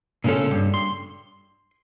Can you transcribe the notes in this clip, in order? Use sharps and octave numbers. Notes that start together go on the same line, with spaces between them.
A#2 C#3 G#3 C#4 A4
G2
C6